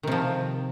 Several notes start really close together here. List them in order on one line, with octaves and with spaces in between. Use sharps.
D#3 C3 F3